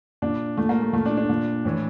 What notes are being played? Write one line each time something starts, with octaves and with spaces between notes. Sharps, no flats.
A#2 D4
A#2 A3
A#3
A3
A#2 A3
D4
D4
A#2
A2 E3